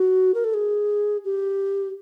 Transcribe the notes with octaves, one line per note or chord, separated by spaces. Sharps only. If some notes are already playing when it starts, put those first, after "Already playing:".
Already playing: F#4
A#4
A4
G#4
G4